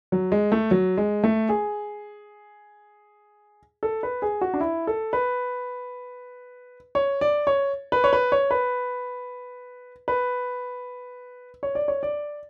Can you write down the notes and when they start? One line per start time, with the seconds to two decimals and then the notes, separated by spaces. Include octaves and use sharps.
0.12 F#3
0.32 G#3
0.52 A3
0.71 F#3
0.97 G#3
1.24 A3
1.49 G#4
3.83 A4
4.03 B4
4.22 G#4
4.41 F#4
4.54 D4
4.61 E4
4.87 A4
5.13 B4
6.95 C#5
7.21 D5
7.47 C#5
7.92 B4
8.04 C#5
8.13 B4
8.32 C#5
8.51 B4
10.08 B4
11.63 C#5
11.75 D5
11.88 C#5
12.03 D5